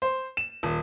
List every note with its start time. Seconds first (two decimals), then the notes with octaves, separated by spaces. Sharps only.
0.02 C5
0.37 E7
0.63 D#1